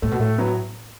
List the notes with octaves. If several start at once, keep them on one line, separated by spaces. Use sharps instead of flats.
A2 A3
B2
A2 A3
F#3 B3